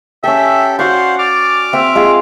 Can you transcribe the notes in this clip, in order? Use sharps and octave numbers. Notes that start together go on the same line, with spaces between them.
C#4 G4 A4 E5 G5
F#4 C5 D5 F5 F#5 C#6
D5 D6 F6
C4 E5 F#5
G#3 F4 G#4